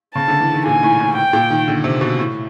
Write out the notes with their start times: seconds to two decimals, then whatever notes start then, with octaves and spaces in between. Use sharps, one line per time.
0.15 C#3 A5
0.28 D3
0.40 E3
0.53 D#3
0.66 A#2 G#5
0.83 A2
1.00 A2
1.16 G5
1.33 A#2
1.50 D#3
1.68 D3
1.84 C3
2.01 B2
2.19 A2